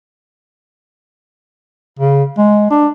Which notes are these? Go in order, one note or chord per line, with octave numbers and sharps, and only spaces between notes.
C#3
G#3
D4